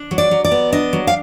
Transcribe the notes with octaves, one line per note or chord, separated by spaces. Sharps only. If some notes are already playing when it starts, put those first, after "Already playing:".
Already playing: D4
F#3
D5
F#3
D5
B3
D4 D#5
F#3
F5